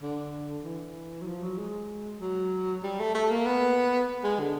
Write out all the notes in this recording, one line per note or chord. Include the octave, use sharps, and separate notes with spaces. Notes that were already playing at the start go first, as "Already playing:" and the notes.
D3
E3
F#3
F3
F#3
G#3
F#3
G3
A3
A3
A#3
B3
G#3
D3